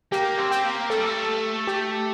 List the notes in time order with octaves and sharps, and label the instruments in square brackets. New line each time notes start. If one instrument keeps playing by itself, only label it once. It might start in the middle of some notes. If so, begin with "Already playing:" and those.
[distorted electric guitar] A#3 [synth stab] G4
[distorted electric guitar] C4
[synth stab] G4
[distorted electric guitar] A#3
[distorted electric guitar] A3 [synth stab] A4
[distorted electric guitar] G3
A3
[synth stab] G4